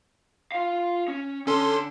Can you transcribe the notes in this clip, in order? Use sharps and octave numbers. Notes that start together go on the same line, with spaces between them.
F4 F5
C#4
D3 C#4 A4 C6